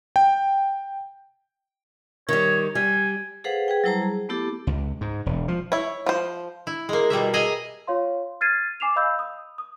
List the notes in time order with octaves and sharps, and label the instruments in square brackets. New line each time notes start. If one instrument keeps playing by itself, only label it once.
[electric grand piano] G5
[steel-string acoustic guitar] D#3 G3 [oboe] C#5
[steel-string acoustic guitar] G3 [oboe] G#5
[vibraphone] G#4 A4 B4 C5 F5 F#5
G#4 B4 G5
F#3 G3 E4 C5 A5 A#5
G#4
A3 B3 E4 G4 A4 D6
[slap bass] C#2
G#2
E1
F3
[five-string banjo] E4 C#5
F3 C5
[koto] E4
G#3 A#3
B2 G3 A#3 E5
G#4 D#5 E5 G#5 A#5
[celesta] F4 C#5 F5 C6
F6 G#6 A6 C7 D#7
G#5 D6 C7 E7 F7
D#5 F5 B5 E6 G6
D#6
D#6